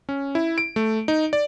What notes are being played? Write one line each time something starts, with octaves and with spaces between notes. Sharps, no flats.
C#4
E4
D7
A3
D#4
D5